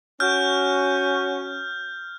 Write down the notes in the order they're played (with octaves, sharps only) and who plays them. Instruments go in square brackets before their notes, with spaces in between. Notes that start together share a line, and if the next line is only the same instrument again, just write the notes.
[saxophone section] C#4 F#4 [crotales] F6 G6